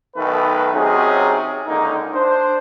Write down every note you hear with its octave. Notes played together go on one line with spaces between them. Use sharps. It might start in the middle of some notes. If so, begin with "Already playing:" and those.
B1 D#3 A3 B4
C3 F#3 C#4 D#4 G#4
C#2 D3 A#3 D#4
D4 C5